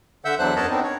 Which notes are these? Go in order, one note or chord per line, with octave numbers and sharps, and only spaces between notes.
D3 E5 F#5 E6 G6
E2 F#3 D4 C5 F#6
F#2 B3 A#4 C#5 D#5 A5
B3 C4 D4 D#4
C#5